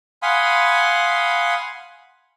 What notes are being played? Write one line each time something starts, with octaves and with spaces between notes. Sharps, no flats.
F5 F#5 G#5 B5 C6 D#6